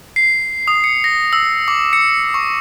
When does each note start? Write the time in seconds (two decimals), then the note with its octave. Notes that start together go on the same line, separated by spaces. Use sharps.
0.16 C7
0.68 D#6
0.84 C#7
1.04 A#6
1.33 E6
1.68 D6
1.93 C#7
2.34 C#6